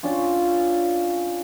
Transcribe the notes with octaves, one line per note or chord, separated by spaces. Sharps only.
C#4 D4 F4